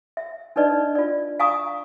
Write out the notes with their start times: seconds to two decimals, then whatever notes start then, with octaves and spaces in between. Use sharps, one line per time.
0.17 E5
0.56 D4 D#4 B4 D5 D#5
0.95 F4 D5
1.40 F5 G#5 A#5 C#6 D#6